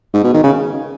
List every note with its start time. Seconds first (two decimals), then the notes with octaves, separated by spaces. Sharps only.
0.14 G#2
0.24 B2
0.34 D#3
0.43 C#3